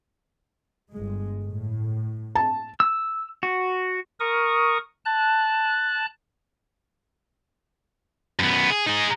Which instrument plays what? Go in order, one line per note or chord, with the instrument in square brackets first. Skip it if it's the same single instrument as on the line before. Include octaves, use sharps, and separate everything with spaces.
[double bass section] G1 G#3
A2
[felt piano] A5
[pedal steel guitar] E6
F#4
[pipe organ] A#4 C#6 D#6
A5 F#6
[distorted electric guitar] F#2 B3
G#4
D#4 G#4